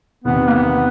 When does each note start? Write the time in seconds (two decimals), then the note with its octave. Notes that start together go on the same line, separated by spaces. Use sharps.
0.24 E2 C3 D#3 B3
0.48 A#3
0.54 B3